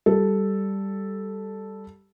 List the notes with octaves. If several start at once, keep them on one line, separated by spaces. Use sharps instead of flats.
G3 A4